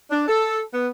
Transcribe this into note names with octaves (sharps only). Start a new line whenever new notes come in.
D4
A4
B3